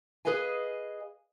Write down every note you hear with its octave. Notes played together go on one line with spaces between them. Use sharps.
G#4 A#4 B4 D#5 F5 G#5